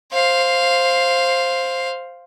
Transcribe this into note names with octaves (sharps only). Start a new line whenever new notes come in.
C5 F5